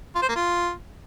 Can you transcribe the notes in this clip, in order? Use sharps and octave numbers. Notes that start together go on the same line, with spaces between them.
F4
C5
A#3
F4